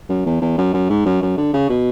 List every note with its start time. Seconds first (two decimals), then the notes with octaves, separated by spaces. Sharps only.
0.09 F#2
0.25 E2
0.41 E2
0.58 F#2
0.73 F#2
0.90 G#2
1.06 F#2
1.22 F#2
1.37 D3
1.54 C#3
1.69 B2